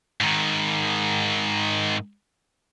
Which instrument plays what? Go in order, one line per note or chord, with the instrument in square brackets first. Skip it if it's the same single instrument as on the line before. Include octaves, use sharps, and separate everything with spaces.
[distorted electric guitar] G#2 D#3